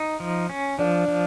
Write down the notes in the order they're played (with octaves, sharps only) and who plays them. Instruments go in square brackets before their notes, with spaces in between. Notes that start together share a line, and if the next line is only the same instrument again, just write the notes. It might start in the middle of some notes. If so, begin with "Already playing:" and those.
Already playing: [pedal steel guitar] D#4
F3
C#4
[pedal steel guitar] F3 [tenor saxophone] D4
[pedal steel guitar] F3